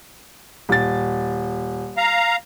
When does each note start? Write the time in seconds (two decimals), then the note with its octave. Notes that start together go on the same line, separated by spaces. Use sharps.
0.69 D#1 A6
1.97 F5 A#5